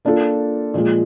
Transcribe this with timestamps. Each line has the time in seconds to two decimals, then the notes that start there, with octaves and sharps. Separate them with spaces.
0.05 A#3 D4 F4 A4
0.74 A#2 F3 G#3